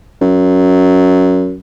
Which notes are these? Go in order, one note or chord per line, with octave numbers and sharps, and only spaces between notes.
F#2